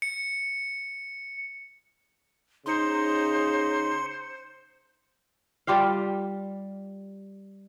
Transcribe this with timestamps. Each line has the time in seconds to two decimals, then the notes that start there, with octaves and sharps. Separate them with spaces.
0.02 C#7
2.66 C#3 D#4 C5 C6 C#7
5.67 G3 F4 G4 F5